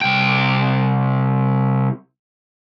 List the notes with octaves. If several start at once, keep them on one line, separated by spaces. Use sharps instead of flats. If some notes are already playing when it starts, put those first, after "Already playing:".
C2 G5